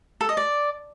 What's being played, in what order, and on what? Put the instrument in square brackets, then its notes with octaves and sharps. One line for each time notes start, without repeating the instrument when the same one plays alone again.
[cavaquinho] A4
D#5
D5